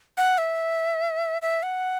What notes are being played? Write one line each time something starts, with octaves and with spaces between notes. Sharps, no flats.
F#5
E5
E5
F#5